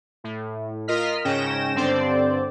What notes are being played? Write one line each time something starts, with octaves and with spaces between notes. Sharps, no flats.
A2
F4 A#4 D#5 F6 B6
G#2 C#3 C#4 G5 A#6 E7
G2 D3 C4 C5 D5